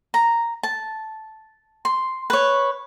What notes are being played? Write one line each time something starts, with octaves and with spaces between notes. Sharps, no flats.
A#5
A5
C6
B4 C#5